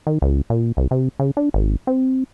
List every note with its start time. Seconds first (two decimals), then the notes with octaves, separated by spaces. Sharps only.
0.07 D#3
0.22 C#2
0.50 A#2
0.77 C2
0.91 C3
1.20 C#3
1.37 D4
1.54 G#1
1.87 C4